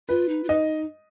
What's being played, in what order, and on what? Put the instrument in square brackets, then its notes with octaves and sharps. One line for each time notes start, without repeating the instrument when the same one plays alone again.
[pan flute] F4 [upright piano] B4
[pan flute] D#4
F4
[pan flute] D#4 [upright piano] D#5